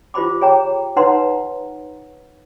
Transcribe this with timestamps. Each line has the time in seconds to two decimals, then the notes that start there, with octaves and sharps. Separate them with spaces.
0.14 F4 G4 C5 B5 D6
0.41 G#4 C#5 G5 A#5
0.96 D#4 B4 C#5 F#5 A#5 C6